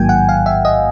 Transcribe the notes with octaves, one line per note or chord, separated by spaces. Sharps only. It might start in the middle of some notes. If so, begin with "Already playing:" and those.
Already playing: A1 G#2 D#3 F#3 A#3 G5 G#5
F#5
F5
E5
D#5